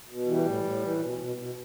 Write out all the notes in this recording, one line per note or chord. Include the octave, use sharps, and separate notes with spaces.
B2
E3 G3
A2
A2
E3
B2
B2
B2